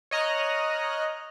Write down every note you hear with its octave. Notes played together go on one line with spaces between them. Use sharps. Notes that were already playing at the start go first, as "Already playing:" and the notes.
C#5 D#5 A#5 F6 F#6